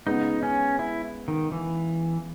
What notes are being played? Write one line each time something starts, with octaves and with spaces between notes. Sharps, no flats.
C#3 G#3 B3 D#4
C#4
E4
D#3
E3